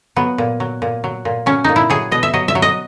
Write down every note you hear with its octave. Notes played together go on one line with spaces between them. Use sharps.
F#3 B3
A#2
F#3
A#2
F#3
A#2
F#3 C#4
A#2 D#4
E4
F#3 G#4
B2 D#5
E5
F#3 D#5
E5
F#3
D#5